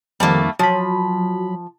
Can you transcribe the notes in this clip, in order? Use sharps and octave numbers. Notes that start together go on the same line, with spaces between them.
F2 D#3 G3 A3 A#3
F3 F#3 B5